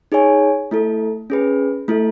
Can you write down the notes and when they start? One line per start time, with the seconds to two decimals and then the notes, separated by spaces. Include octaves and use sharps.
0.12 D#4 G#4 C#5 G#5
0.71 A3 E4 A4
1.30 C#4 G#4 B4
1.88 A3 E4 A4